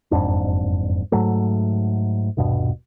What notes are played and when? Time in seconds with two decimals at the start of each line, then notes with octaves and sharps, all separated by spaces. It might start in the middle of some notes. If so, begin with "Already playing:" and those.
0.11 F#1 F2 G#2 D4
1.12 G#2 F#3 A3
2.37 D#1 G2 B2